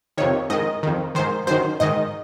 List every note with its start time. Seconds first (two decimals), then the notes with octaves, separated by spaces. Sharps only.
0.18 F2 C3 D#3 C#5
0.50 G#2 D#3 D#5
0.83 F2 D#3
1.15 G#2 D#3 C5
1.47 F#2 D#3 C5
1.80 G#2 D#3 D#5